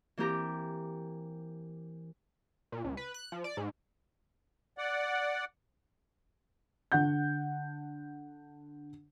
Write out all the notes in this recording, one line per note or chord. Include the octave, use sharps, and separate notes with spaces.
E3 A#3 C4 G4 A#5 D6
A#2
C#2
B4
F#6
F3
D5
G#2
D5 F#5
D3 F#5 G6